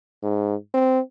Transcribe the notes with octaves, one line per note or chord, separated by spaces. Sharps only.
G#2
C4